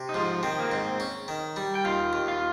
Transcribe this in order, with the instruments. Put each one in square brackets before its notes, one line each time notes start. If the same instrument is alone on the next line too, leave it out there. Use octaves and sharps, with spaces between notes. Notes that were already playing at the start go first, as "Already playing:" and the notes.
Already playing: [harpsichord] C3
[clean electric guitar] D#4
[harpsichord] G#2 [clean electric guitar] F3 F4
[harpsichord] D#3 [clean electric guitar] C4
[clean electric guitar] A#3
[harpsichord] G#2 [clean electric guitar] C4
[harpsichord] C#4
D#3
G3
[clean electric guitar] G5
[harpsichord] D#2 [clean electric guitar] F4 F5
[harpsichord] D#2
[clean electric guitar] F4 F5